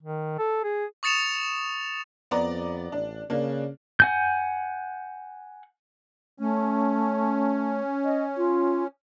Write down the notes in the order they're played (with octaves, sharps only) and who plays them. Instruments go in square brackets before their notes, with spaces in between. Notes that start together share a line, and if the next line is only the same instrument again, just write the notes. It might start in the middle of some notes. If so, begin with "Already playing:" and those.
[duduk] D#3
A4
G#4
[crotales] C#6 D#6 A6 C#7 E7 F7
[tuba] F2 [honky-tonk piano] B3 D5 A#5
[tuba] A1 [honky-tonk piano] D4
[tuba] C#3 [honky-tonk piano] A#3 D4
[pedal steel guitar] F#5 G#5 G6
[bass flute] A3 [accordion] C#4
[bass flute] D#5
F4